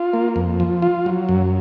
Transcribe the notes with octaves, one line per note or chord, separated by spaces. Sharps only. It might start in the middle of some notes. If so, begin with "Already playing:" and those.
Already playing: F4
A#3
F2
F3
F4
F#3
F#2